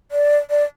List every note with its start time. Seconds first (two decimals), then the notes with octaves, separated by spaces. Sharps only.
0.11 D5
0.50 D5